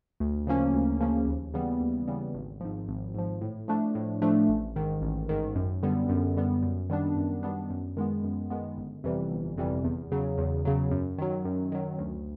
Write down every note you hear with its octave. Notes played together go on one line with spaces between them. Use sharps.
D2
C#3 F3 A#3 C#4
D2
C#3 F3 A#3 C#4
D#2
C#3 E3 G3 B3
D#2
C#3 E3 G3 B3
G#1
G#2 F3
G#1
G#2 F3
A2
F3 A3 D4
A2
F3 A3 D4
A1
G#2 D#3
A1
G#2 D#3
F#2
D3 G3 B3
F#2
D3 G3 B3
F#2
D#3 G3 B3 D4
F#2
D#3 G3 B3 D4
F#2
D#3 G#3 B3
F#2
D#3 G#3 B3
G1
F2 C3 E3 G3
G1
F2 C3 E3 G3
E2
C#3 F#3
E2
C#3 F#3
F#2
D#3 F#3
F#2
D#3 F#3
D2